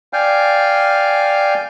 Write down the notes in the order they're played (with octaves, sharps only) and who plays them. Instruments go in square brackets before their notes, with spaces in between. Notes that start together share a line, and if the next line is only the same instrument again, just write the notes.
[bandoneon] D5 F5 G5 G#5 F6 G6